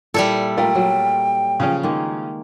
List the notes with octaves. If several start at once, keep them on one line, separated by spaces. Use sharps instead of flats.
A#2 G3 E4 A4
A3 F4 A#4 G5
F#3
C#3 F3 C#4
D#3 G#3 A#3